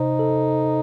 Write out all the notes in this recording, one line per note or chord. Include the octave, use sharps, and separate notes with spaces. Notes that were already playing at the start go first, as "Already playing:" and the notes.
Already playing: C3 D#4 C5
A4